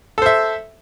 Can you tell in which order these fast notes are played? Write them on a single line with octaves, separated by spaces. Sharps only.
A4 C5 E5